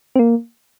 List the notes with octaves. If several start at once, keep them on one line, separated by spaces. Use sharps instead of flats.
C4
A#3